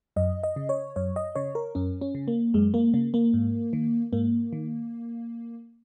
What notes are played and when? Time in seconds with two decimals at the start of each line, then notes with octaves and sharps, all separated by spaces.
0.16 F#2 D#5
0.43 D#5
0.56 C#3
0.69 C#5
0.96 F#2 C#5
1.16 D#5
1.35 C#3 C#5
1.55 A#4
1.75 F#2 C#4
2.01 C#4
2.15 C#3
2.28 A#3
2.54 F#2 G#3
2.74 A#3
2.94 C#3 A#3
3.14 A#3
3.34 G#2
3.73 D#3
4.13 G#2 A#3
4.53 D#3